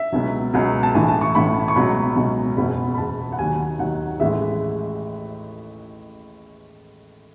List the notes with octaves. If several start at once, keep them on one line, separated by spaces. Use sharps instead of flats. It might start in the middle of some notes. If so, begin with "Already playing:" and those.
Already playing: E5
C#2 B2 F#3
C#2 B2 F#3
A5
A1 A2 E3 G#5
A5
C#6
A1 A2 E3 B5
C#6
C#2 B2 F#3 B5
C#2 B2 F#3
F#1 E2 B2 B5
B5
F#1 E2 B2 A5
F#5
D#2 D#3 F#3 G#5
D#2 D#3 F#3 F#5
A1 A2 E3 G#3 E5